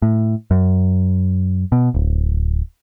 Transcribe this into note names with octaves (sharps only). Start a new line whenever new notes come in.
A2
F#2
B2
D1